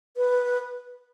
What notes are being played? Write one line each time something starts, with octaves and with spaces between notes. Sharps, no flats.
B4